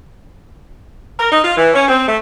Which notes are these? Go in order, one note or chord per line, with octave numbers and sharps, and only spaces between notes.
A#4
D#4
F4
E3
C#4
C4
A3